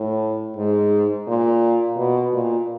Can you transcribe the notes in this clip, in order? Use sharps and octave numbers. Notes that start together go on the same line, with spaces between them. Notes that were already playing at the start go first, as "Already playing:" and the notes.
Already playing: A2
G#2
A#2
B2
A#2